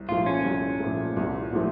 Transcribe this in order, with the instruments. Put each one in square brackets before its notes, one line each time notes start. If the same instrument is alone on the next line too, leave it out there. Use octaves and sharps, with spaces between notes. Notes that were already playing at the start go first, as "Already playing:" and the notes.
Already playing: [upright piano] C2
[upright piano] A#2 F3 A3 [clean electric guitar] F4
[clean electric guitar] C#4
[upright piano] C2
A#2 F3 A3
C2
A#2 F3 A3